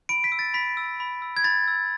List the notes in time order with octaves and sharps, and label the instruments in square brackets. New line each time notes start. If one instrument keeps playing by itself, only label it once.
[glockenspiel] B5 D7
B6
E6
A6
B5 B6
E6
B5
E6
G#6
B5 A6
E6